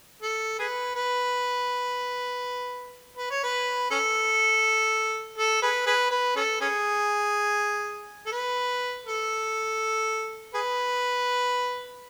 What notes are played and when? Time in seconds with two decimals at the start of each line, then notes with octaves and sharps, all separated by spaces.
0.23 A4
0.59 G#4 B4
0.96 B4
3.17 B4
3.30 C#5
3.43 B4
3.91 C#4 A4
5.38 A4
5.62 G#4 B4
5.86 G#4 B4
6.11 B4
6.36 C#4 A4
6.61 C#4 G#4
8.26 A4
8.32 B4
9.07 A4
10.54 G#4 B4